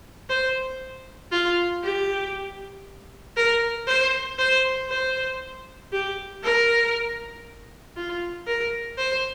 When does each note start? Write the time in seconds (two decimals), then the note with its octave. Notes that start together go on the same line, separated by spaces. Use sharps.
0.29 C5
1.32 F4
1.84 G4
3.36 A#4
3.87 C5
4.39 C5
4.89 C5
5.92 G4
6.43 A#4
7.97 F4
8.47 A#4
8.98 C5